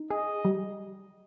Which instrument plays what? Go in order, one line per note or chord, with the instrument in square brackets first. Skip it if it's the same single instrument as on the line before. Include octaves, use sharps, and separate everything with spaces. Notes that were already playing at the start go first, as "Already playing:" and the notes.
Already playing: [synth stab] D#4
[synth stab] G#4 [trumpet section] D#5
[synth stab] G3